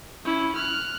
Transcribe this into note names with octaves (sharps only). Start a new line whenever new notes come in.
C#4 E4
F6 F#6